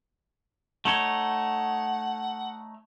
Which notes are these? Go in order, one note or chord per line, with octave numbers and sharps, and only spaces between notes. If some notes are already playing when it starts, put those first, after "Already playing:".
A3 D#4 C#5 F#5